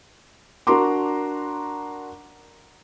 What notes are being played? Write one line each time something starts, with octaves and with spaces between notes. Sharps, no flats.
D4 F#4 A#4 A#5 C6 D6